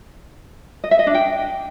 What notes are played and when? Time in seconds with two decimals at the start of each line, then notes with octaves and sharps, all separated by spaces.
0.84 D#5
0.91 E5
0.99 D#5
1.07 D4
1.14 G5